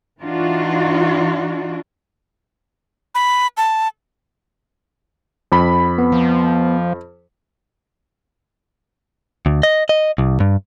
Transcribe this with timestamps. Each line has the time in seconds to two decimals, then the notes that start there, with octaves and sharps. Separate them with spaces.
0.21 E3 D4 D#4 F4 F#4
3.15 B5
3.57 A5
5.52 F2 B5
5.98 B3
6.12 F3
9.46 D2
9.63 D#5
9.89 D#5
10.18 C2
10.40 G2